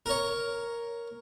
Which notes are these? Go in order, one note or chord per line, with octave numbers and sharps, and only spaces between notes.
A#4 C#5